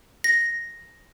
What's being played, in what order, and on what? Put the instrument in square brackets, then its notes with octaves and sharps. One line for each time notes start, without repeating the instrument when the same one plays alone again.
[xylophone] A#6